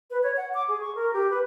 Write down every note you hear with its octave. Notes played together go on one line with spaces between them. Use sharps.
B4
C#5
F#5
D6
G#4
C#6
A#4
G4
B4